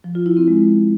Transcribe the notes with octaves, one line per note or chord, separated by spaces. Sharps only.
F3
F4
E4
C4
G#3